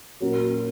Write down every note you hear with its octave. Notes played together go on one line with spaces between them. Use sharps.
A#2 F#3 C#4 F#4 A#4